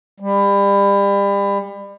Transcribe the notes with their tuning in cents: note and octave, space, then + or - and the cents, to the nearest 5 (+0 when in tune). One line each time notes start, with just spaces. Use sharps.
G3 +30